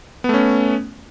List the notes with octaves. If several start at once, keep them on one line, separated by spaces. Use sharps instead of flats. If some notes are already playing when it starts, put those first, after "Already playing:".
A3 B3 C#4